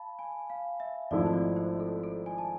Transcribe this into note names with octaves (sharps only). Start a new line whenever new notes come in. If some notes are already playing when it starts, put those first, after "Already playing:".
Already playing: F5 A5 B5
G#5
F5
E5
G#1 G#2 F3 A3 E4 D5
C5
D5
C5
A4
A4
G#5
A5